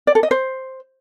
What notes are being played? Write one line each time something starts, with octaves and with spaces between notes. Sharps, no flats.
D5
A4
D#5
C5